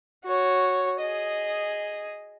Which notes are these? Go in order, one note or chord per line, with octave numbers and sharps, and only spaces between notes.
F#4 C#5
G#4 D#5